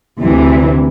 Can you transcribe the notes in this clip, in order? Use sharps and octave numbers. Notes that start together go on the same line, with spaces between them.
D2 C3 E3